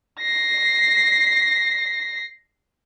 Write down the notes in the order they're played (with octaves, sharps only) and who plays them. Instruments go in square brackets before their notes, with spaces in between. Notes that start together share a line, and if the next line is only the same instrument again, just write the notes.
[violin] A#6 C7